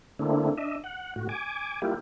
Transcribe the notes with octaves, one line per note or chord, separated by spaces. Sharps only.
D3 A3 A#3 C4 D4 E4
D4 D#5 E5
F#5
A2 F#4
G#5 D6
G3 A#3 E4 F4 G4